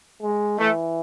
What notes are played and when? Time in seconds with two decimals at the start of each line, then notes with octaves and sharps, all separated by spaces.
0.22 G#3
0.59 E3 A3